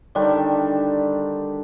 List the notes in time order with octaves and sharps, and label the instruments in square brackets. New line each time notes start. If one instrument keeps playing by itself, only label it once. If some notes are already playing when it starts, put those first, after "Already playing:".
[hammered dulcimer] D3 D#3 G3 D4